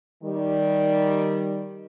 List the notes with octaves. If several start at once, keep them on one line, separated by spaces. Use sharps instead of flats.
D#3 G3